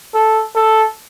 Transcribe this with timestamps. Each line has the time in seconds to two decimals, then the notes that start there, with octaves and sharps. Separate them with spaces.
0.14 A4
0.55 A4